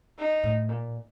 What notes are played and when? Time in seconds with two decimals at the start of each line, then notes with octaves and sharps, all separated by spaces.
0.18 D#4
0.43 A2
0.69 A#2